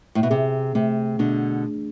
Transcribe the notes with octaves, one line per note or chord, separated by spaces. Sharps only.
A2
B2
C3 G#4
C3 A3
B2 D3 D4